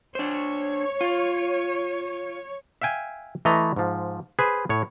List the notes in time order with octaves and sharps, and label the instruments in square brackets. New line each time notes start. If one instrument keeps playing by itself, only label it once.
[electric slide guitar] D4 C5 [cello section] C#5
[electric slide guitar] F4
[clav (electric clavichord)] E5 F5 G5 G#5
E3 A3 D#5 A#5
G#2 F3
G#4 B4 C5
A2 C#5